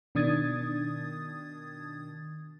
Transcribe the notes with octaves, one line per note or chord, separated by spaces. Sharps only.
B2 D#3 D4 D#6 G#6 A6